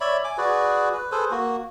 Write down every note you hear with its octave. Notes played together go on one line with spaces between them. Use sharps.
C#5 D5 E5 B5
G#5 D6
F#4 G#4 B4 D5
B4
G#4 A4 B4 C5
A#3 F#4